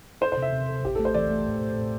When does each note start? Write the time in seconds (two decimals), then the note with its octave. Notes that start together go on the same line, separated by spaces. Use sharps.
0.21 A4 C5
0.32 C5
0.37 C3 E5
0.53 C3
0.69 A4
0.84 A1 G4
0.95 A3 A4
1.05 C5
1.14 E3 D5
1.30 A3
1.45 A2
1.61 A2
1.78 A2